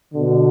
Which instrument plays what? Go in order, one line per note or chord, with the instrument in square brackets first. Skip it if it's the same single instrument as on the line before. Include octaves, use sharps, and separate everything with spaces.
[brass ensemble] B2 D3